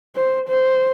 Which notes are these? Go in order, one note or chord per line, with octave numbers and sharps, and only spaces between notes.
C5
C5